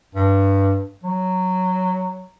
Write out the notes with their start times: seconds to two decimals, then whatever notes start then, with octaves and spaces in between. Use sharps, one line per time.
0.15 G2
1.04 F#3